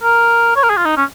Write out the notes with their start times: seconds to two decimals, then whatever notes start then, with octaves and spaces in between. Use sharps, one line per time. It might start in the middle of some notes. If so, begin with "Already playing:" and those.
0.03 A#4
0.56 C#5
0.63 A#4
0.70 G#4
0.77 F4
0.85 D#4
0.97 C#4